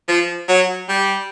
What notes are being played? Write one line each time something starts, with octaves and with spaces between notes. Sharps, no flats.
F3
F#3
G3